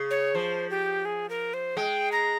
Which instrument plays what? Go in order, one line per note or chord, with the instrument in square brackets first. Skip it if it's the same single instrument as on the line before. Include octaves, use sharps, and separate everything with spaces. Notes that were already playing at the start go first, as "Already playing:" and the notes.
Already playing: [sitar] C#3
[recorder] C#5
[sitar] F3 [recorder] C5
[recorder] G4
G#4
A#4
C5
[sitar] G#3 [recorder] G5
[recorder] A#5